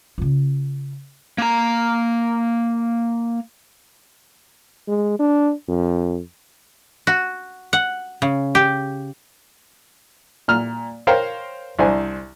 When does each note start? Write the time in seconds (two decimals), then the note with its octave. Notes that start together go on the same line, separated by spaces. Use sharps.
0.18 C#3 F4
1.38 A#3 A#5
4.88 G#3
5.19 D4
5.68 F2
7.07 F#4
7.73 F#5
8.22 C#3
8.55 G4
10.48 A#2 F6
11.07 A#4 C5 C#5 F5 G5 A#5
11.79 C2 D4 C5 G#5